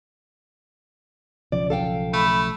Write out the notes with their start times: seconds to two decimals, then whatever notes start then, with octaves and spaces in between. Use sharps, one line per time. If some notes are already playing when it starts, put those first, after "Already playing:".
1.52 B1 C#3 F3 D5
1.70 A4 F5 G5
2.13 A3 B5